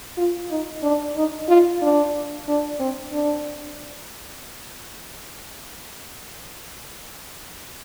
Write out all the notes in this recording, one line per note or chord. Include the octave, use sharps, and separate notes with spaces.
F4
D#4
D4
D#4
F4
D4
D4
C4
D4